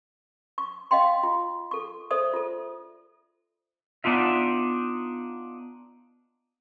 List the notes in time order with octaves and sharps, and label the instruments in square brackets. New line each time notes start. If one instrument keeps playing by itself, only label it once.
[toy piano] C#6
D#5 F5 G5 C6
F4
A4 C#6
A4 C5 D5 E5 D#6
F4 A4
[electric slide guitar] B3 D4 D#4 F4 E5